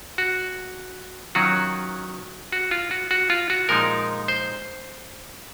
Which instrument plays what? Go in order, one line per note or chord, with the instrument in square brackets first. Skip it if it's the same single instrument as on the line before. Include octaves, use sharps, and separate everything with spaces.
[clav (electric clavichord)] F#4
D#3 F#3 C#4 F4 F#4
F#4
F4
F#4
F#4
F4
F#4
A#2 F3 G#3 D#4 A#4
C5